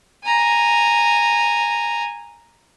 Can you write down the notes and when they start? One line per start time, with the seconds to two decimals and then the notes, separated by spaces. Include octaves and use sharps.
0.24 G#5 A#5